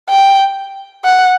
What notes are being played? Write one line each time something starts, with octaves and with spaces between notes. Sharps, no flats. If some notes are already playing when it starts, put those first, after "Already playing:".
G5
F#5